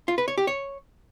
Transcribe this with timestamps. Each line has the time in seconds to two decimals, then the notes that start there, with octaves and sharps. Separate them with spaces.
0.08 F4
0.18 B4
0.28 C#5
0.38 G4
0.47 C#5